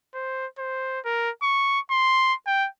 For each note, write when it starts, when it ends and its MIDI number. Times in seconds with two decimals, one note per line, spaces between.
0.14 0.46 72
0.58 1.00 72
1.05 1.30 70
1.42 1.80 85
1.91 2.34 84
2.47 2.68 79